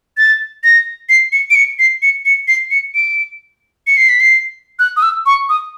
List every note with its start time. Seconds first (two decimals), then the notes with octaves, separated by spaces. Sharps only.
0.17 A6
0.64 A#6
1.09 C7
1.32 C#7
1.50 D7
1.55 C#7
1.79 C7
2.02 C#7
2.26 C#7
2.48 C7
2.71 C#7
2.94 D7
3.87 C#7
3.97 C7
4.09 B6
4.20 C7
4.79 F#6
4.97 D#6
5.02 E6
5.26 C#6
5.49 D#6